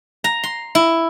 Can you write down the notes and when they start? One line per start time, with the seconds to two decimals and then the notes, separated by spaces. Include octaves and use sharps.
0.24 A#5
0.43 C6
0.75 E4